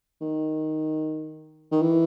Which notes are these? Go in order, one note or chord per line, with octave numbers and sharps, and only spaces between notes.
D#3
D#3
E3